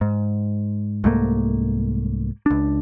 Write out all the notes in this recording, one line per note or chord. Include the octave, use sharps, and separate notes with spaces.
G#2
C2 G#2 A3 A#3
C#2 D4